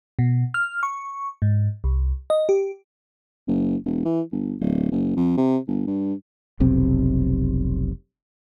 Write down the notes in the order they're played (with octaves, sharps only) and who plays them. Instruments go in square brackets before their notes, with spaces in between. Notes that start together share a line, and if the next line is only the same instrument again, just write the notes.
[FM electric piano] B2
F6
C#6
G#2
C2
D#5
G4
[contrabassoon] F#1
E1
E3
G1
D1
F#1
F2
C3
G1
G2
[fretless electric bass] F1 B1 C3 C4